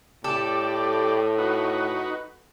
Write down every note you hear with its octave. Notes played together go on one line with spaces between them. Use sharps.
A2 G4 A4 D5
D#4 F#4 B4